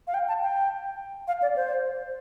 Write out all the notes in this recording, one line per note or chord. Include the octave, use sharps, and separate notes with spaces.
F5
G5
A5
G5
F5
D5
C5